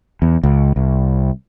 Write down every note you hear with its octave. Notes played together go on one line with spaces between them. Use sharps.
E2
C#2
C2